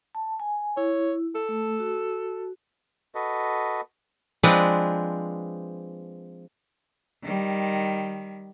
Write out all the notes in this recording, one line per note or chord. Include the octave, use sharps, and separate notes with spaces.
A5
G#5
E4 C#5
A4
A3
F#4
F#4 A4 B4 D#5
F3 G#3 C4 D4 B4
D#3 G3